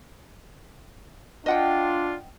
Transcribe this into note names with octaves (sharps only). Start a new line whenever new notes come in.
D4 F4 D#5 F#5 G5